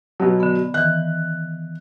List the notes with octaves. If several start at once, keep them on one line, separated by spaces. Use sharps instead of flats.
B2 F#3
D3 B3
D#3 E3 F#6